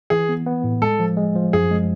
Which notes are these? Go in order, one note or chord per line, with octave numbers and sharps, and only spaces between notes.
E3 G#4
B3
B3
A2
G#3 A4
F3
G#3
F3
F#2 G#4
G#3